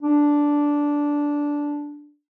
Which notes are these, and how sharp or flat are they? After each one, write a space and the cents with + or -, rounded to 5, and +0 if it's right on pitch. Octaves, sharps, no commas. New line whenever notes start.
D4 -10